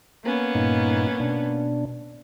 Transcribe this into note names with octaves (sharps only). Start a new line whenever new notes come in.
A#3 B3 C#4
G2 A#2 D#4
B2 D4